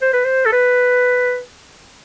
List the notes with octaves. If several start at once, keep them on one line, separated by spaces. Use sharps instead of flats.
C5
B4
C5
A4
B4